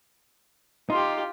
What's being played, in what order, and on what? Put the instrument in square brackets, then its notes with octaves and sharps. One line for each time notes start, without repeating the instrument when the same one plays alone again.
[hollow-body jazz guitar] D#4 [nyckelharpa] F4 G4 [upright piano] C6